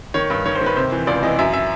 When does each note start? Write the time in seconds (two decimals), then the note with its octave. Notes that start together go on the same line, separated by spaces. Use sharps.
0.14 D#3 C#5
0.30 G2
0.45 D#3 C#5
0.55 C5
0.61 D#3 B4
0.76 C3 C5
0.92 E3
1.07 C#2 D5
1.23 E3 D#5
1.39 F#2 E5
1.54 E5